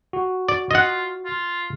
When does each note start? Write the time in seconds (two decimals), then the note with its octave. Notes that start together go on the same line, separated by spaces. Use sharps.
0.13 F#4
0.49 D5
0.71 F4 D#5 F#5
1.25 F4